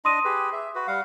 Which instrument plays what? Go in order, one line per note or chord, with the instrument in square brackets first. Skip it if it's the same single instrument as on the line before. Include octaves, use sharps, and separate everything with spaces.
[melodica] D4 D#5 [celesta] C6 D#6 D#7
[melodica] G4 G#4 B4
E5
F#4 B4
G3 F5 F#5